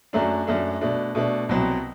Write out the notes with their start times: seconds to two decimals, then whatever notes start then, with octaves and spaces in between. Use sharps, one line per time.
0.13 F#2 F#3 A3 D4
0.47 F#2 F#3 A3 D4
0.81 B2 A3 D4
1.15 B2 A3 D4
1.49 C2 B2 F#3 C4